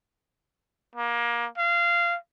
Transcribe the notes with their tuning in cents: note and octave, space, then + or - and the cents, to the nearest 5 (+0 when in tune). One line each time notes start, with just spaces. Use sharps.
A#3 +25
F5 -20